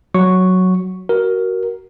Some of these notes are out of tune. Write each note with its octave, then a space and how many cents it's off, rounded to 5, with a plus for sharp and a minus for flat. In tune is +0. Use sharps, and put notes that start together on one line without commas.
F#3 +0 C#6 +0
F#4 +20 A#4 +5